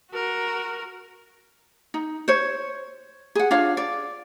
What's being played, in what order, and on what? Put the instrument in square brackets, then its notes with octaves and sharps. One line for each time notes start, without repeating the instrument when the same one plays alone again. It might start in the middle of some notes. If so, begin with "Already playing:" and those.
[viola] F#4 A#4
[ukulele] D#4
C5 C#5
G#4 F#5
D4 F4 C#5 F5
D5